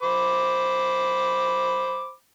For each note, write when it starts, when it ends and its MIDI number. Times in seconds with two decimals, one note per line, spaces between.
0.03 2.12 72
0.03 2.12 83
0.03 2.12 86